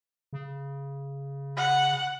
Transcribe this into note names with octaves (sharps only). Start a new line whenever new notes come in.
C#3
F#5